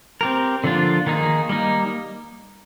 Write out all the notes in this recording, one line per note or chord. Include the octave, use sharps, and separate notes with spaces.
C4 G4 A#4
D3 F3 A#3 D4 F4
D#3 A#3 D#4 G#4
G3 A#3 D#4